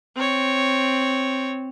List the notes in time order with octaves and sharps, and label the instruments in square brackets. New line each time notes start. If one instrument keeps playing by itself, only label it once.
[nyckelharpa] C4 C#5